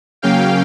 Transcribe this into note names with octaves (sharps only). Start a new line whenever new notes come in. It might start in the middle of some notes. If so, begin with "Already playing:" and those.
C#3 F#3 A#3 C#4 F5 G5